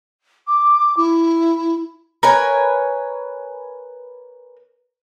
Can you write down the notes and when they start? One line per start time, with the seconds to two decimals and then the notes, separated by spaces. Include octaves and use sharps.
0.47 D6
0.96 E4
2.23 A#4 B4 C#5 G#5